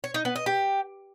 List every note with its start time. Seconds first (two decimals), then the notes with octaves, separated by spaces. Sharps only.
0.04 C#5
0.14 D#4
0.25 B3
0.36 D#5
0.46 G4